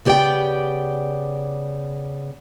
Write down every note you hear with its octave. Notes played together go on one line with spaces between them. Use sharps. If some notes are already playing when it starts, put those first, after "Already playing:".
C#3 B3 G4 C#5 D5 G5